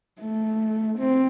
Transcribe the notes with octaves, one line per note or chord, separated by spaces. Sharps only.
A3
C4